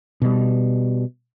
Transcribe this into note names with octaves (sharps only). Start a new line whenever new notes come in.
B2 G3